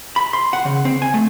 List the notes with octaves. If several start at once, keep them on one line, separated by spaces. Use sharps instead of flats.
B5
C6
F#5
C#3
C4
G#5
A3